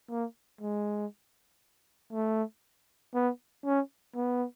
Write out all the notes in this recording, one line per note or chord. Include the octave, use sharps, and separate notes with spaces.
A#3
G#3
A3
B3
C#4
B3